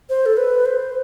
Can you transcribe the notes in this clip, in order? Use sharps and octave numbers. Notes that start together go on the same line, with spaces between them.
C5
A4
B4
C5